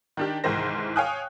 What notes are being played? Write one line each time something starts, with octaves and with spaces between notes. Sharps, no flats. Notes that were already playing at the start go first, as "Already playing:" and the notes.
D#3 D4 G4
C2 G#2 D#3 E3 C5 A#6
C#5 F5 G5 G#5 D#6 F#6